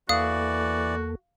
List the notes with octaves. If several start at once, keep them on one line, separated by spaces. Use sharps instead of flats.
E2 E3 A#3 F#4 A4 D5 F5 D#6